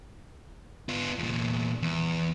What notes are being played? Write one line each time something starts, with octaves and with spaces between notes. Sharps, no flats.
B3 F4
E2 A#2
E2